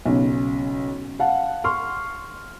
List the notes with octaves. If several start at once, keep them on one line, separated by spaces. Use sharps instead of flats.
B1 C#3
F5 F#5 A5
C6 C#6 F6